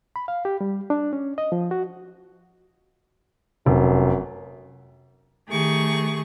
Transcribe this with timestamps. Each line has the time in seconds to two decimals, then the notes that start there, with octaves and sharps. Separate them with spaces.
0.16 B5
0.28 F5
0.45 G4
0.61 G3
0.90 D4
1.13 C#4
1.38 D#5
1.52 F3
1.71 F#4
3.66 F1 F#2
5.48 D#3 A3 G4 G#4 C#6